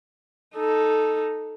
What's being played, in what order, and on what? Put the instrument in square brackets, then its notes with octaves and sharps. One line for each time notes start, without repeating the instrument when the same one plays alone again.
[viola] D#4 A4